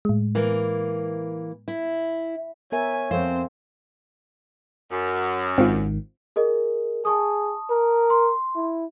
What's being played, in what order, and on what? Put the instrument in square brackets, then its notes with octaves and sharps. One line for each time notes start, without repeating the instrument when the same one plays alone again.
[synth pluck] A2 G#3
[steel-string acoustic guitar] E3 A#3
E4
[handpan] B3 A#4 E5 [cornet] C#5 [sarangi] G#5
[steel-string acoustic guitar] F2 C5 [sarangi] C4 [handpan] A4 F5
[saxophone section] F#2
[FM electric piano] G#1 G#2 D#3 [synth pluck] C4 F4
[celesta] G#4 A#4 D#5
[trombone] G#4 [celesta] A5 C#6 D#6
[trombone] A#4
[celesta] C6
[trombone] E4